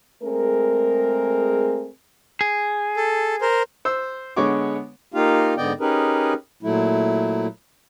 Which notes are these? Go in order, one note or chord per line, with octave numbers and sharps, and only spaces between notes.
G#3 A3 C4 G#4 A#4
G#4
A4
A#4 C5
C5 E6
D3 G#3 B3 C#5 C#6 D6
A#3 D#4 F4 G4 F5
G#2 D3 B3 D5 D#5 G5
C#4 D#4 G4 G#4 A#4 B4
A#2 F#3 A3 E4